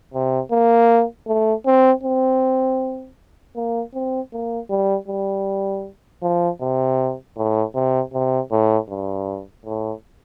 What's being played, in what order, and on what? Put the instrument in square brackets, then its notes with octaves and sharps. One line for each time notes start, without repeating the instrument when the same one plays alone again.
[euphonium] C3
A#3
A3
C4
C4
A#3
C4
A#3
G3
G3
F3
C3
A2
C3
C3
A2
G2
A2